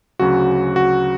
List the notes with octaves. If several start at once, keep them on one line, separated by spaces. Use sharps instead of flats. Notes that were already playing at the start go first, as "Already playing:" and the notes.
D2 C#3 F#3 F#4
F#4